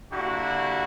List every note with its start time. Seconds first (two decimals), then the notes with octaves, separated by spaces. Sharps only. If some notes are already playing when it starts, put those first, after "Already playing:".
0.12 D3 G3 A#3 E4 F#4